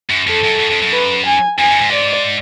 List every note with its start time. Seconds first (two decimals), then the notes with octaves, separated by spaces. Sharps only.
0.10 F#2
0.27 F2 A4
0.44 F#2
0.59 F#2
0.71 F2
0.82 F#2
0.93 B4
1.26 G#5
1.59 F2 G#5
1.70 F#2
1.81 G#2
1.92 D5